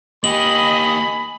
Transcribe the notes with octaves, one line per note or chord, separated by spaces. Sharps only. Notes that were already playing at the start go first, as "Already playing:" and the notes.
A#3 G4 D#5 G#5 B5 F#7